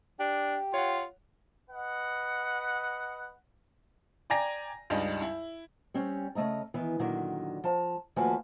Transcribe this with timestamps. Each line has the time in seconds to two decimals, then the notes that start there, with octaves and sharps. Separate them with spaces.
0.20 D4 G4
0.74 F4 C#5 F#5
1.70 B4 D#5 F#5
4.30 D5 G5 G#5 A#5 A#6
4.90 C#2 G2 G3 D#4
5.22 E4
5.94 G3 C4 C#4
6.35 C#3 F3 A3 D#5 A#5
6.74 D#3 E3 B3
6.99 A#2 D3 D#3 F#3
7.64 F3 A5 A#5
8.16 D#2 F3 A3 F#4 B4 G#5